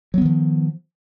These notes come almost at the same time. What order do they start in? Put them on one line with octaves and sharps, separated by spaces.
F#3 B3 D#3 F3